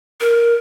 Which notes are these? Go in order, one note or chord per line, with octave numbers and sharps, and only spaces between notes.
A#4